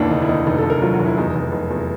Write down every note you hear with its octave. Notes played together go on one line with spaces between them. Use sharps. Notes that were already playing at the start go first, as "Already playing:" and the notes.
Already playing: F1 D#2 D4 E4
D3 D#4
E4
D#2 D#4
F1 D#4
A4
F1
A#4
F#3 F4
F#4
F1
E4
E2 D#4
F1
F1
E2